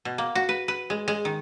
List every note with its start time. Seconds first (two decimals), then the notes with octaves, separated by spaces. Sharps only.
0.05 B2
0.18 A#3
0.35 F#4
0.49 B4
0.68 B4
0.90 G#3
1.08 G#3
1.25 D#3